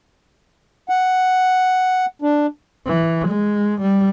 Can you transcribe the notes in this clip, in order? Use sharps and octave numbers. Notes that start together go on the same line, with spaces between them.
F#5
D4
E3
G#3
G3